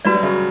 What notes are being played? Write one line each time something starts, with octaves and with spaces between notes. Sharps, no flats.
G3 F#4 B4 D5
F#3
C#3